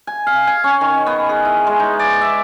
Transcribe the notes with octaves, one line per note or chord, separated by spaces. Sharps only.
G#5
F5
G#5
C#4
D#3
B3
G#4
E4
G#3
D#4
D5
E5